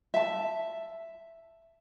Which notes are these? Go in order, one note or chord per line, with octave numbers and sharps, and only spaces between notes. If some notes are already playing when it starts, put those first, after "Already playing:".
E5 A5